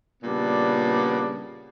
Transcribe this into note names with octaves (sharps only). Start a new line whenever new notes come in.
A#2 C#3 G3 B3 D4